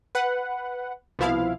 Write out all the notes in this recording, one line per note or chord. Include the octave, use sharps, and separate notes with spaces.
B4 F#5
C2 B2 F3 E4 F5